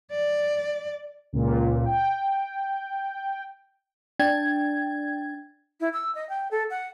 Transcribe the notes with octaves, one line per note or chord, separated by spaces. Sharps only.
D5
C#2 A#2
G5
D4 G5 G#6
E4
E6
D#5
G5
A4
F#5